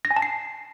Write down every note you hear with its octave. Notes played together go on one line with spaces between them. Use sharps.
A#6
G#5
A5
C7